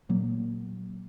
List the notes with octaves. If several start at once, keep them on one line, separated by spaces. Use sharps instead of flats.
A#2 F#3 A#3